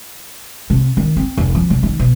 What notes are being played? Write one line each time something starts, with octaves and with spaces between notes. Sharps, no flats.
C3
D#3
C4
F1
F3
C3
D#3
B2